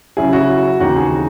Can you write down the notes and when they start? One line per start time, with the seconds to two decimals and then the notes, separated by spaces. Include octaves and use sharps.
0.17 C#3 F#3 C#4 E4 G#4
0.33 F#4
0.80 D#2 C#3 E3 C4 D#4 F#4
0.96 G#4